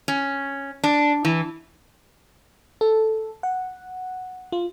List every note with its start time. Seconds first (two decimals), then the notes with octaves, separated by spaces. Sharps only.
0.08 C#4
0.84 D4
1.25 E3
2.81 A4
3.43 F#5
4.52 F4